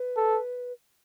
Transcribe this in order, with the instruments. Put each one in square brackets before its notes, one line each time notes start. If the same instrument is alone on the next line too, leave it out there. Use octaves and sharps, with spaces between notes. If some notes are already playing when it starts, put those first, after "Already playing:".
Already playing: [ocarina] B4
[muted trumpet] A4